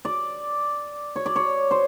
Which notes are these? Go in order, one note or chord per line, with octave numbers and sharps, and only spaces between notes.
D5
C#5
D5
C#5
C5